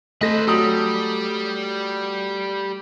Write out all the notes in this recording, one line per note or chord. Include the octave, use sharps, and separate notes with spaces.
A3 A4 B4 C5 D#5 A#6
F#3 G3 D#6 F#7